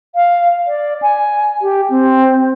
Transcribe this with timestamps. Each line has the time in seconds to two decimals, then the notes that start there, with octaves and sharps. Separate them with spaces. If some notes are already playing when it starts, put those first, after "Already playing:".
0.15 F5
0.67 D5
1.02 G#5
1.62 G4
1.90 C4